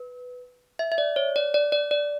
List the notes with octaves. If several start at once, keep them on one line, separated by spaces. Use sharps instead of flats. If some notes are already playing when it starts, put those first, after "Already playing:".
Already playing: B4
E5
E5
D5
C#5
D5
D5
D5
D5